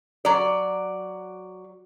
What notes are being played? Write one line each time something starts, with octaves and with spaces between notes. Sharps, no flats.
F#3 D5